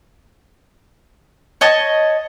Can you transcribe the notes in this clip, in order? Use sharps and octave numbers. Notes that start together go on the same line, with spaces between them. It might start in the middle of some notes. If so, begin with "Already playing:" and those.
C#5 D#5 A5